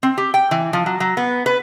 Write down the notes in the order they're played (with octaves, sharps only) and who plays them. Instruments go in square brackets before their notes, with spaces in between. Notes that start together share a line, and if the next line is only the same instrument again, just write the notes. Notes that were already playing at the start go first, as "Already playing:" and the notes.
[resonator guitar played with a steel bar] C4
G4
G5
E3
F3
F#3
F#3
B3
B4